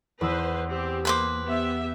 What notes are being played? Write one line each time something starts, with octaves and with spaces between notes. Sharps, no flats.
E2 B4 C5 E6
C4 G4
A#3 B4 C5 D6
B3 G4 E5